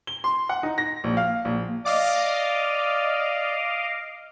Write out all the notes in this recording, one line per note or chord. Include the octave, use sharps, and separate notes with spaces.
G7
C6
F#5
D#4
A#6
A#1
F5
A#1
D5 D#5 F5 D6